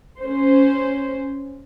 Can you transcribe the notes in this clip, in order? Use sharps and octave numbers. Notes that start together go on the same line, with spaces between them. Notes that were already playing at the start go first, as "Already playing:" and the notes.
C#4 C5